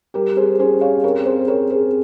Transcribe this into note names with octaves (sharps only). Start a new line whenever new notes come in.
G3 G4 A#4
G#4 C5
C#4 G#4 C5
C#5 F5
C4 A#4 C#5
G#4 C5
C4 A#4 C#5
G#4 C5